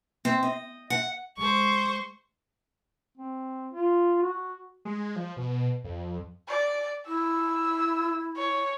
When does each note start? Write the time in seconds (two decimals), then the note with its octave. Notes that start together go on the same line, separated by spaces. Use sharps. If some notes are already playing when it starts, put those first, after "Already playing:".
0.25 C4
0.43 D#5
0.90 F#5
1.37 G#3 C5 C#6
3.18 C4
3.73 F4
4.23 F#4
4.85 G#3
5.16 F3
5.37 B2
5.84 F2
6.48 D5
7.08 E4 E6
8.37 C#5